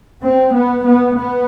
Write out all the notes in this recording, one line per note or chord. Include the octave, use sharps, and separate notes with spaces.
C4
B3
B3
B3